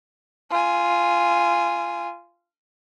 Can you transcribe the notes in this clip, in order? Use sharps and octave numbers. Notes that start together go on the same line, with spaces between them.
F4 G#5